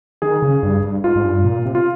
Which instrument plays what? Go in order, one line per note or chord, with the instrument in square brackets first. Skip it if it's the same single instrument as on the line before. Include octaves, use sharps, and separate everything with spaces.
[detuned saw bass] D#3 [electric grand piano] G#4
[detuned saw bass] C#3
G2
G2
[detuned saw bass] G#2 [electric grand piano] F4
[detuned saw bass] G#2
G2
A#2
C3
[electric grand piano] F4